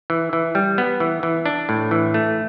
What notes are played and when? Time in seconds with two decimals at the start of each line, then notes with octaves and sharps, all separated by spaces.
0.10 E3
0.33 E3
0.55 G3
0.78 B3
1.00 E3
1.23 E3
1.46 D4
1.69 A2
1.91 E3
2.14 A3